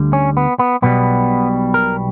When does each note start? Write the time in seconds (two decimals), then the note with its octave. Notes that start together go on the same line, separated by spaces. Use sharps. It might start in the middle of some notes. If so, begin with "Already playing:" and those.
Already playing: D2 D3 G3
0.13 C#4
0.37 B3
0.59 B3
0.82 B1 B2 G3 B3
1.74 A#4